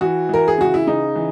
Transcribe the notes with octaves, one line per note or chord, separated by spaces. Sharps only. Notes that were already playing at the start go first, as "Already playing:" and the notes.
E3 F#4
E3 A#4
G#4
C#3 F#4
E4
C#3 D#4
E3